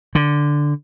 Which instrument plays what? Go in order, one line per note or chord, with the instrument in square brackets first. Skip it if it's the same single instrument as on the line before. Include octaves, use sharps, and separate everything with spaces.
[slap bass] D3